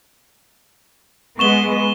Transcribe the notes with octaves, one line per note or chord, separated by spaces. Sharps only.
G#3 B3 C#6 E7 G7